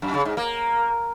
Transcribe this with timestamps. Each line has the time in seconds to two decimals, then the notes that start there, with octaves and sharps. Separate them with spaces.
0.02 F#2
0.14 C#3
0.25 G#2
0.37 A#3